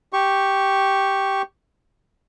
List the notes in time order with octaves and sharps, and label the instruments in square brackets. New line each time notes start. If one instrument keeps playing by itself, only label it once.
[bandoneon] G4 C#6